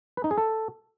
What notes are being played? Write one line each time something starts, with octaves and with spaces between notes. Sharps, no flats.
B4
D#4
G#4
A4